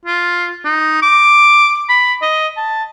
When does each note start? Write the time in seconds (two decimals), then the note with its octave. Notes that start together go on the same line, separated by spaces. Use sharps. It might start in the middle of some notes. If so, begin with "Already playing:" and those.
0.05 F4
0.65 D#4
1.02 D6
1.89 B5
2.22 D#5
2.57 A5